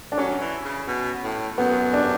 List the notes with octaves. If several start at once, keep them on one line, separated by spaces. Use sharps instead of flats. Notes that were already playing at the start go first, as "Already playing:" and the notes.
D4
F#3 C#4
E3
C#3
B2
A2
F#2 B3
D4